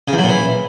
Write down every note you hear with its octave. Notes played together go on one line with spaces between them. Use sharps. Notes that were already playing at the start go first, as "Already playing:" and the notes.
C#3
E2
F#3
A#2
E3